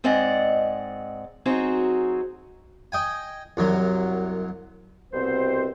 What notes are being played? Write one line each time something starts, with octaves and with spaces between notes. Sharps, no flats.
G#2 C4 D5 D#5 F#5
F#3 C4 D#4 F#4 G#4
D#5 G5 G#5
C2 F#2 F#3
C2 B2 C4 C5